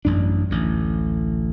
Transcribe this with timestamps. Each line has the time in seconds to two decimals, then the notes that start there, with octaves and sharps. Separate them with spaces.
0.05 A1 F#2 D4
0.50 A1 D2